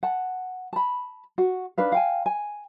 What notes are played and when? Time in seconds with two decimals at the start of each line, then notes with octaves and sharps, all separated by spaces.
0.03 F#5 A5
0.73 A5 B5
1.38 F#4
1.78 D4 D#4 B4 F5
1.92 F5 G5 G#5
2.26 G#5